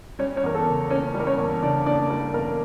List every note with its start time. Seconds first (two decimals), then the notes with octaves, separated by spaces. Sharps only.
0.19 G3 C#4 C#5
0.36 C#4 C#5
0.43 E2 A#4
0.55 A4
0.67 C#3
0.90 A#3 C#4 C#5
1.14 G3
1.20 A#4
1.27 C#4 C#5
1.38 E2
1.62 C#3 D4 D5
1.86 A#3 D4 D5
2.10 G3 A#4
2.34 E2 A#4